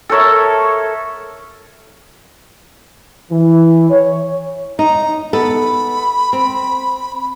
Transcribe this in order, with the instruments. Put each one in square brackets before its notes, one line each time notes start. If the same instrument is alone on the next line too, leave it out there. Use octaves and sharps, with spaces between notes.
[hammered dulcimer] A4 A#4 C#5 E5
[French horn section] E3
C#5
[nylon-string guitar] D#4 [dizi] A#5
[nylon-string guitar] B3 A4 [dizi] B5
[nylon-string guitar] C4